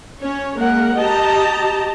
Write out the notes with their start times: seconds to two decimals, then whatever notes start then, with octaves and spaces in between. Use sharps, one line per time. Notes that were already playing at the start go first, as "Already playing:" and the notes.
0.21 C#4 C#5
0.56 G#3 A#3 A#4 F#5
0.96 G4 D#5 A5 A#5